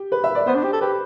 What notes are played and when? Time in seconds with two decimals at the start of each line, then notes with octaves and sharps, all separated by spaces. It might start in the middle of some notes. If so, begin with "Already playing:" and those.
Already playing: G4
0.12 B4
0.24 E5
0.35 D5
0.47 B3 C5
0.55 D4
0.64 G4
0.73 A4
0.81 G4 B4